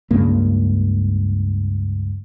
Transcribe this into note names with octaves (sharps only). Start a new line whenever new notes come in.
C#2 G2 C#3 A#3